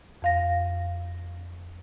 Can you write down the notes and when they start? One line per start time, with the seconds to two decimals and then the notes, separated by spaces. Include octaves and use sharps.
0.22 F2 F5 A#6